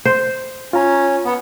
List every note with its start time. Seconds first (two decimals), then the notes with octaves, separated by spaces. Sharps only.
0.05 C5
0.73 C#4 F4 A#5
1.25 B3